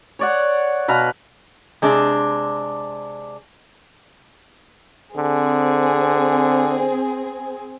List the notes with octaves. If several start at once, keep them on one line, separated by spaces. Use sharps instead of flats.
C#5 D5 F#5
B2 B4 F5 A#5
C3 G#3 D4
D3 C4 G#4